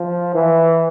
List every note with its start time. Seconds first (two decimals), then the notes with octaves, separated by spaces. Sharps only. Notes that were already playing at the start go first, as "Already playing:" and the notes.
Already playing: F3
0.34 E3